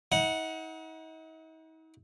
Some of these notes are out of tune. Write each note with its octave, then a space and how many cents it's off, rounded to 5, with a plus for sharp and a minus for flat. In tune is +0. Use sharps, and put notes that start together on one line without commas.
D#4 +45 F#5 +0